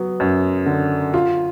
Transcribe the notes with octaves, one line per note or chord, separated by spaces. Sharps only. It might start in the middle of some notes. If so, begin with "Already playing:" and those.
Already playing: F#3 B3
F#2
D3
F4